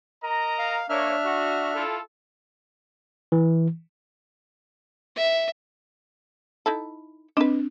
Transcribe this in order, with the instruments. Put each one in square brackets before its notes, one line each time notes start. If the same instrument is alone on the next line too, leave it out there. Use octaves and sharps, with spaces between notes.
[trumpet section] A#4 D#5 A#5
[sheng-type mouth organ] F5
[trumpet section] A#3 C#5 [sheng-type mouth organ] D4 E5 F6
[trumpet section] F#4
E4 F4 A4
[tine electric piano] E3
[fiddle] E5
[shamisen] D#4 E4 A4
[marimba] C4 D4 [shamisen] B4 D#5